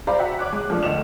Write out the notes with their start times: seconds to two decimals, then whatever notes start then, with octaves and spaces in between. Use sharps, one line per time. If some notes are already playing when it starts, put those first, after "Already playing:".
0.07 C5 D5 F5 A#5 B5
0.19 F#4 E5 F#5
0.39 C#5 D6 F#6
0.53 G#3 F#6
0.70 F3 A3 D4
0.83 D2 A3 D#5 E7 F7